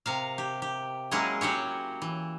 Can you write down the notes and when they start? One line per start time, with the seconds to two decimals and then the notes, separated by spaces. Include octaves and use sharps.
0.06 C3 A#4 F5
0.38 G4
0.62 G4
1.11 F#3 G#3 A#3 C#4 E4 G#4
1.41 F#3 F#4 G4 C#5
2.02 E3